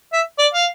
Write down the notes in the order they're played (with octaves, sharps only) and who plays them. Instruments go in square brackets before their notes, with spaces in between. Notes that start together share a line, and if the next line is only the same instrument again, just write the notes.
[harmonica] E5
D5
F5